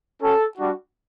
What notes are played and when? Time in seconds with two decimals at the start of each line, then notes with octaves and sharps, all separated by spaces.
0.21 C#4 F#4 A4
0.58 G3 D4 F#4